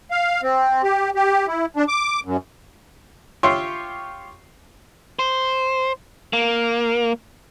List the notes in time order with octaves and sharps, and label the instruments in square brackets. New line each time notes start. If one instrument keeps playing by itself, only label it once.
[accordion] F5
C4
G4
G4
E4
D4
D6
F#2
[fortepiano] F4 G4 C#5 E5 C6
[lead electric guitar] C5
A#3